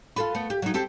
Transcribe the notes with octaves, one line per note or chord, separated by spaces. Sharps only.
F4 A4 B4
A3 B3
G4
F#3 D#4
C4 G4 A4